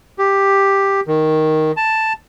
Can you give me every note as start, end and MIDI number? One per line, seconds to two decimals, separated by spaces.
0.19 1.00 67
1.07 1.72 51
1.77 2.13 81